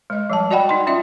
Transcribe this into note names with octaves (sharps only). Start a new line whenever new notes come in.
G#3 D#5
F3 G3 A5
F#4 D5 D#5 F#5 G5 B5
D#4 C6
C#4 F4 D5 E5